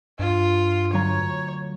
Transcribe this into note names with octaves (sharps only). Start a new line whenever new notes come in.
G2 F4
D2 F#3 C#5 A#5